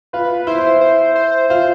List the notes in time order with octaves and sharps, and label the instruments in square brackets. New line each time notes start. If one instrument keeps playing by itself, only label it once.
[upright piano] F4 [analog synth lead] B4
[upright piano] E4 [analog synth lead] C5
[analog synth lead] C5
C5
[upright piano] F4 [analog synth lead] C5